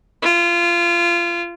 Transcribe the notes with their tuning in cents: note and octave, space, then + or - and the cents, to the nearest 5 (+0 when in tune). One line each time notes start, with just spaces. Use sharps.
F4 -25